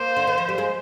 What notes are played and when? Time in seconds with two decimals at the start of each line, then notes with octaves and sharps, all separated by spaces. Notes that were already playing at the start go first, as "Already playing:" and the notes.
Already playing: A#3 C5
0.17 D3
0.27 D#3
0.38 F3
0.49 G3
0.58 G#3